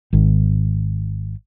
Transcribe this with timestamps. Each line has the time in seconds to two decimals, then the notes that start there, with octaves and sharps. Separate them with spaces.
0.13 G#1 D#3